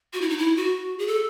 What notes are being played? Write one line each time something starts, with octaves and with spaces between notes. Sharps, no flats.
F#4
E4
D#4
E4
F#4
G#4
A4